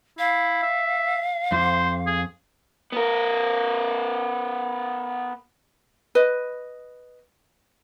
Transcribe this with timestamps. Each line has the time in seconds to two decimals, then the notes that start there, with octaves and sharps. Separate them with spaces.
0.19 E4 F5
0.63 E5
1.52 F2 C5
2.06 G#4
2.92 B3 A#4
6.15 B4 D#5